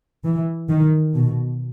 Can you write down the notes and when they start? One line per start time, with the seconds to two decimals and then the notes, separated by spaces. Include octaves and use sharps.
0.24 E3
0.69 D#3
1.15 B2